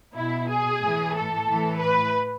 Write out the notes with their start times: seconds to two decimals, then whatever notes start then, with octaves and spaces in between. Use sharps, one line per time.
0.16 B2 E4
0.49 G#4
0.82 A2 E3
1.15 A4
1.48 A2 E3
1.80 B4